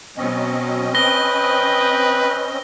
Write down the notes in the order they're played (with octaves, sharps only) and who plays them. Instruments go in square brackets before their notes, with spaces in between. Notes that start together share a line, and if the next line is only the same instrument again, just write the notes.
[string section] B2 F#3 [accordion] C4 C#4 D#5
[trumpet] B4 [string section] G5 D#6 [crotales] A#6 G7